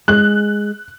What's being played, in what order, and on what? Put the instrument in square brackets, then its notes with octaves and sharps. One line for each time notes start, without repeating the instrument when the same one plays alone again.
[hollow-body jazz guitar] G#3 [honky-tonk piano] F#6